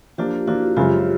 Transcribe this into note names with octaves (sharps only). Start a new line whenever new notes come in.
F3 A#3 D4 F4 G4
F3 A#3 D4 E4 F#4
F#2 C#3 F3 G#3 F4 G4